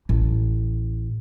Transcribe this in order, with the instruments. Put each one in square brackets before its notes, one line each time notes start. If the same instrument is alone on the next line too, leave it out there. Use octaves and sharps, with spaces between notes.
[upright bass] A1